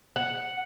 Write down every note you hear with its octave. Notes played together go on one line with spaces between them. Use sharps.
F#5